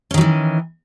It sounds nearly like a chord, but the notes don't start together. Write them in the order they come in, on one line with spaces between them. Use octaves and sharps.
C#4 D#3 F#3 E3